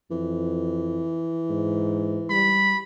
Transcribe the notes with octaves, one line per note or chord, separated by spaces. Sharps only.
F2 E3
G#2
G3 B5